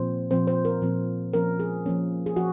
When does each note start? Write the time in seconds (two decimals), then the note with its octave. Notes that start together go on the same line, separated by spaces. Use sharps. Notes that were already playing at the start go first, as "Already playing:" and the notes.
Already playing: A#2 F3 C4 C5
0.31 A#2 F3 C4 C5
0.47 C5
0.65 A#4
0.82 A#2 F3 C4
1.33 F3 A#3 C#4 A#4
1.60 G#4
1.86 F3 A#3 C#4
2.26 G#4
2.36 F3 F#4